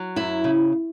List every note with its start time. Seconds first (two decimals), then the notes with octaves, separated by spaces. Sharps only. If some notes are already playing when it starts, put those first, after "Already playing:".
Already playing: F#3
0.16 F#2 E4
0.44 C#3